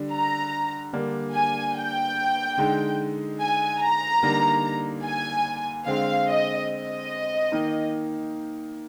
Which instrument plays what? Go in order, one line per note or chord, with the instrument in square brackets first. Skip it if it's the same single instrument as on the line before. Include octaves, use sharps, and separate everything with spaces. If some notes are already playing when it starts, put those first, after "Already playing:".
Already playing: [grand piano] D3 G3 D4
[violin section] A#5
[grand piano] D3 G3 A#3 D4
[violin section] G#5
G5
[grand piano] D3 G#3 D#4
[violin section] G#5
A#5
[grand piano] D3 G3 A#3 D#4
[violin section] G#5
[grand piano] D3 G#3 C4 [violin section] F5
[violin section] D#5
D#5
[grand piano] D#3 A#3 D#4